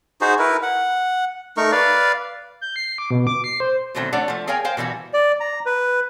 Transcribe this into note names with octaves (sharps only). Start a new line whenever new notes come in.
D#4 F#4 G#4 C5
E4 A#4 B4
F#5
A3 D#4 A#4 C#6
B4 D5 F5
G6
C7
D6
B2
D6
C7
C5
B2 D3 D#3 F#3 A3 C4
A3 D4 C#5 D5 F#5
F3 A3
G#4 A#4 C#5 F5 G5 G#5
A#4 C5 F5 G5
B2 E3 G3 F#4
D5
A#5
B4